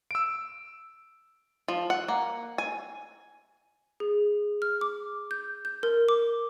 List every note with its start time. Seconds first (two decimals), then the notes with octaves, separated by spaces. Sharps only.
0.11 E6 D7
1.68 F3
1.90 F#5
2.08 A#3
2.58 G#5
4.00 G#4
4.62 F6
4.81 D6
5.31 G6
5.65 G6
5.83 A#4
6.09 D6